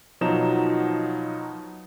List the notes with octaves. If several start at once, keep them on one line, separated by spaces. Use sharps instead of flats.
B2 F3 F#3 D#4 E7